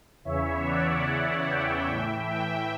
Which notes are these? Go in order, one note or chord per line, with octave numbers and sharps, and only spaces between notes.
E2 C#3 E3 C#5 E5
D5 F#5
D5 F#5
E5 G5
A2
E3
E5 G5